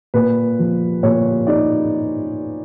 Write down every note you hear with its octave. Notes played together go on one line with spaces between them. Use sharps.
A#2 B4
F3
A#2 C#5
D#4 D5